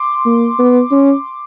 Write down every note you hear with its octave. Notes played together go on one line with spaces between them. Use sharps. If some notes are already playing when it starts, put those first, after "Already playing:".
Already playing: C6 D6
A#3
B3
C#4